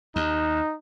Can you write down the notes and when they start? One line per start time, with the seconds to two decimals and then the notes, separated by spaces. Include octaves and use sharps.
0.16 D#2 D#4